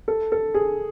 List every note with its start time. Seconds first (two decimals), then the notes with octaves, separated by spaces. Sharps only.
0.08 A4
0.32 A4
0.54 G#4